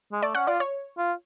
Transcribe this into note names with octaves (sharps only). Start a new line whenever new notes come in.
G#3
A3 D5
C#4 F#5
F4 D5
C#5
F4